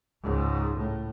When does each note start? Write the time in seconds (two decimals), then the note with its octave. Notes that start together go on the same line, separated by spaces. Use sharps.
0.23 C#2 G#2
0.77 A2